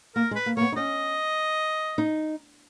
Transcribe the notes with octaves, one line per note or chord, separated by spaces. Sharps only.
A#3 A#4
G#3
B4
A#3
A#3 B3 C#5
D#4
C#4 D#5
D#4